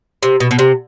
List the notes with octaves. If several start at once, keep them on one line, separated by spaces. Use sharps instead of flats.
C3
B2
B2
C3